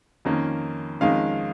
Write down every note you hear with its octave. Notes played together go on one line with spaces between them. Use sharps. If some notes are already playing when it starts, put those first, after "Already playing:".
F2 D#3 A#3 C#4
F2 D#3 G#3 C#4 F5